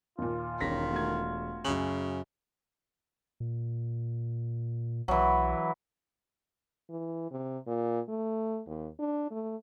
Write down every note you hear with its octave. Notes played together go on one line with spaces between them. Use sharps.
D#2 A#2 F4
E1 D#3 C#4 A#6 B6
A3 F#4 G#6
F#2 C#3 F#7
A#2
B1 E3 F#3
E3
C3
A#2
A3
D#2
D4
A3